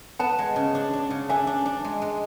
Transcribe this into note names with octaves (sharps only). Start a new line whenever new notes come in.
B3 F#5 A5
G#3
C#3
D4
D4
C#3
D4 E5 G#5
D4
D4
G#3
G#3